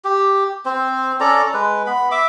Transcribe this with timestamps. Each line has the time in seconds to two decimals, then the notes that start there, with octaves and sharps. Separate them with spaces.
0.05 G4
0.66 C4 C5
1.20 C#4 A4 D5 A#5
1.54 G#3 B4
1.86 B3 B5
2.11 E5 D6